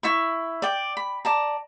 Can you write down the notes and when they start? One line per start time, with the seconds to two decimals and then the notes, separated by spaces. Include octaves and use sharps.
0.03 E4 E5 C#6
0.62 D5 G5
0.97 B5
1.25 D5 A5 A#5